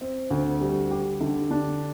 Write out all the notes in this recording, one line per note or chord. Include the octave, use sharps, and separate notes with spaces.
C4
D2
G3
G4
D3
D4